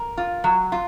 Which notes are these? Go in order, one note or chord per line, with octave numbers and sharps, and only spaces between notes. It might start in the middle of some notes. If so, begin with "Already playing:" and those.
Already playing: A#4
F4
F#3
F4